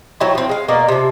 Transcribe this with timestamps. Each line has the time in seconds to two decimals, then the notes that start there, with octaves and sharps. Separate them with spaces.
0.20 F#3 A3 C4 E4
0.35 F3 C4
0.49 G#3 F5
0.68 B2 A#3 A#4 D5
0.88 C3 F3